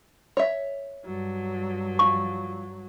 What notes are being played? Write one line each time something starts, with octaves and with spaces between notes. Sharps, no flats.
C#5 E5
G2 F#3
F3 C#6